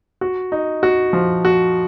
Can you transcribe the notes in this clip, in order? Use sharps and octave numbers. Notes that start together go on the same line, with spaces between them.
F#4
D#4
F#4
F3
F#4